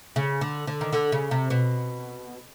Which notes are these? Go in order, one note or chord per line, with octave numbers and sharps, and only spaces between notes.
C#3
D3
D3
D#3
D3
C#3
C3
B2